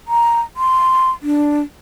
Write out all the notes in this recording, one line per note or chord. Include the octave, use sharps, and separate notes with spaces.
A#5
C6
D4